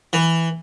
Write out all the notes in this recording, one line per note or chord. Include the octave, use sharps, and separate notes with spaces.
E3